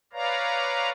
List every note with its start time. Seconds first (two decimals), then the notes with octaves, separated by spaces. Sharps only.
0.13 B4 C#5 D5 F5 A#5